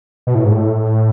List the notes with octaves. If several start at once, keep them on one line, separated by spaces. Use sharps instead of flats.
B2
A2
G#2
A2